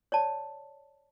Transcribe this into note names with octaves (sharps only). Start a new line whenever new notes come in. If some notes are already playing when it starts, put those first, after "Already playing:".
C#5 D5 A5